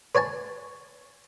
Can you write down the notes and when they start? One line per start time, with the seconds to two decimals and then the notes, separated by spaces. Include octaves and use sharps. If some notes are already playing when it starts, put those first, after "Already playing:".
0.15 B4 C#5 G#5 A5